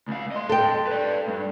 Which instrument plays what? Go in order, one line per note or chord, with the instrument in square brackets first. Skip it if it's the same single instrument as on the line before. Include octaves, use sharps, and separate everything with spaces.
[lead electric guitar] C#2 F5
D#5 C6
[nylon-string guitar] A4 G5
[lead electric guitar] B4 D5
G2